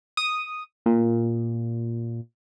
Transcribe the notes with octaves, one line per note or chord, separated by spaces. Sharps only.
D#6
A#2